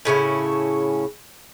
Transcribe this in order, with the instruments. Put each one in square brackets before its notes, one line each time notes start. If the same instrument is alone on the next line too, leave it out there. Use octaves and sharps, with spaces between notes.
[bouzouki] A2 C#3 C#4 E4